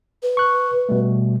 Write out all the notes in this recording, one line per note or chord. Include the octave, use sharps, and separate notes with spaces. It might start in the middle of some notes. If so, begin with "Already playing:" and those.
B4
C#6 F#6
B2 G3 A3